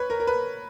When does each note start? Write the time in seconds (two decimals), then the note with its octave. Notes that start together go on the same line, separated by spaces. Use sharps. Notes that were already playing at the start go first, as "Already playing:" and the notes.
Already playing: B4 C#5
0.10 A#4
0.20 A#4
0.27 B4